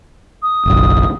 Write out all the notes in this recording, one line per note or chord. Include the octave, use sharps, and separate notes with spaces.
D#6
F#1 B1